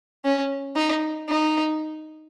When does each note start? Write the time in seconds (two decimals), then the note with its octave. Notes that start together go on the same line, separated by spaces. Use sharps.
0.25 C#4
0.76 D#4
1.29 D#4